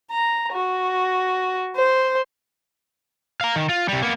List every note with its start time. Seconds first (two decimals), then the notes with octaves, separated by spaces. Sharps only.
0.11 A#5
0.53 F#4
1.76 C5
3.41 F5 A#5
3.56 D#3
3.69 F4
3.89 C3 G3
4.03 A#3 B3